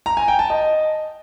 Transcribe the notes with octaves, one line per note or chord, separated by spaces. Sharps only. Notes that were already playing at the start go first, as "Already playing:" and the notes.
A#5
G#5
G5
A5
D#5